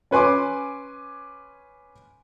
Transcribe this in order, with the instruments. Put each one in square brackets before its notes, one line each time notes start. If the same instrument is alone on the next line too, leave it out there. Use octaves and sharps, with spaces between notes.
[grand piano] C#4 B4 G#5 C6 D6